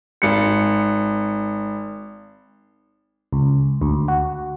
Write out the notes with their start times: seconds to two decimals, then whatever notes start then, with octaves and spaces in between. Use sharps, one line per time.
0.22 G#1 C#7
3.33 C#2
3.81 D2
4.08 F#4